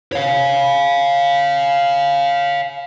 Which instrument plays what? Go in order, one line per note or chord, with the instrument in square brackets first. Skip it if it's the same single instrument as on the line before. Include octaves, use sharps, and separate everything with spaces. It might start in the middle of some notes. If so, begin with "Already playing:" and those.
[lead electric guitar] C#5 F5